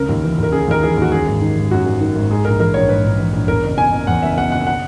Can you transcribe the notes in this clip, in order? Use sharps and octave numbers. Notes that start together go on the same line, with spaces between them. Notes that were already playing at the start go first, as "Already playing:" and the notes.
Already playing: C#2 C#3 A#4
D#2
E3
D#2 A#4
C#3 G#4
D#2 A#4
E3 G#4
D#2 F#4
F#2 G#4
G#1
D#3
G#1
F#2 F#4
G#1
D#3
G#1
G#2 G#4
A#1 A#4
E3 A#4
A#1 C#5
G#2 B4
A#1
E3
A#1
E2 A#4
F#1
B2 G#5
F#1
E2 F#5
F#1 E5
B2 F#5
F#1 F#5
F#5